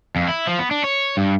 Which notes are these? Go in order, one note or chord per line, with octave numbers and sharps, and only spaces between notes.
F2
E4
F3
B3
D4
C#5
G2